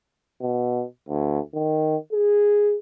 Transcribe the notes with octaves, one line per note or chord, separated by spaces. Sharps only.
B2
D2
D#3
G#4